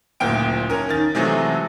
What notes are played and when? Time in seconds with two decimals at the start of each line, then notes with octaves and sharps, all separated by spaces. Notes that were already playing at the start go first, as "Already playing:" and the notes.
0.20 F#1 D2 A#2 G5 D7
0.70 C#4 A#4
0.89 D#3 A6
1.15 C3 E3 F#3 G#3 A3